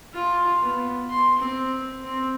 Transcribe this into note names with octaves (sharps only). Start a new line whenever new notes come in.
F4
B3
C6
C4
C4